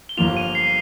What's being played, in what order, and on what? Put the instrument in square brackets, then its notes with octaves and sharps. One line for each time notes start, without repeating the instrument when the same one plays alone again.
[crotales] G7
[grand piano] G1 G2 F3 A#3 F4 [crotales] F7
[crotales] D#7
C7